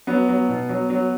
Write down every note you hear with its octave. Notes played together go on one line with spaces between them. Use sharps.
F#3 B3
F#3
B2
F#3
F#3